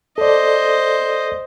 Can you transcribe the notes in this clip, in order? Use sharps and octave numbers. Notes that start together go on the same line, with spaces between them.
A4 C5 D5 D#5